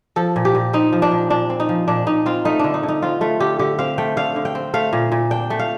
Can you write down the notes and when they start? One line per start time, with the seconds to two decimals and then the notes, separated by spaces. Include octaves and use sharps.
0.16 F3 A4
0.36 A#2
0.45 G4
0.55 A#2
0.73 C4 D#4
0.92 F3
1.02 D4
1.11 A#2
1.30 A#2 D4
1.50 C4
1.60 D#4
1.69 F3
1.88 A#2 D4
2.07 A#2 D#4
2.26 C4 F4
2.45 A3 D#4
2.59 D3 D4
2.74 D#4
2.83 D3
2.88 D#4
3.02 C4 F4
3.21 A3 F4
3.40 D3 G4
3.59 D3 G4
3.79 C4 F5
3.98 A3 G5
4.17 D3 F5
4.36 D3
4.45 G5
4.55 C4
4.74 A3 F5
4.93 A#2
5.12 A#2
5.31 D4 G5
5.50 A3
5.59 F5